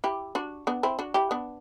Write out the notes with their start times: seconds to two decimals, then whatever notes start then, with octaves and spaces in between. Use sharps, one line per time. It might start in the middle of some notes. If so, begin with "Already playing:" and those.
0.04 E4 G4
0.35 D4 F#4
0.67 B3 D4
0.83 C4 E4
0.99 D4 F#4
1.14 E4 G4
1.31 B3 D4